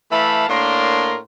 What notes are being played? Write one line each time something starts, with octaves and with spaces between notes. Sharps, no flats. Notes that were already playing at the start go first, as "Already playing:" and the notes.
E3 A3 E5 F5 A5 B5
A2 A#3 D4 A#4 C6